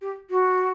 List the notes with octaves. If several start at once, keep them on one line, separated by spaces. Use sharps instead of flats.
G4
F#4